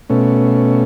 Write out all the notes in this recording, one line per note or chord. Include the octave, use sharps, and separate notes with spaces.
B2 A3 C#4